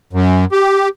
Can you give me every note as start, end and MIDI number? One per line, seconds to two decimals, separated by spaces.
0.13 0.45 42
0.52 0.88 67